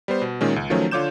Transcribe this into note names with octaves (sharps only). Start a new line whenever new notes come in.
G3 B3 C5
B2
A#2 D#3 G#3 C#4
C#2
D#3 F3 F#3 A3 C#4
D3 F4 C#5 D6 G6 E7